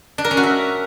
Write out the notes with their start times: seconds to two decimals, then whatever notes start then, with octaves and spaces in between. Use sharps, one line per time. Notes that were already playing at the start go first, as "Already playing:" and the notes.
0.18 D4
0.24 A#4
0.31 C#4
0.37 F#4
0.43 E5